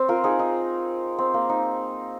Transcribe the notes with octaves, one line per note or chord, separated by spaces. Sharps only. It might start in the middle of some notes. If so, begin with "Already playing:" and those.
Already playing: C4
F4 A#4
D#4 G#4
D#4
C4
A#3
D#4